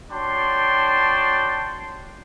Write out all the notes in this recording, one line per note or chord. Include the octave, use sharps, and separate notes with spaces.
D4 F#4 C#5 G5 A5 C6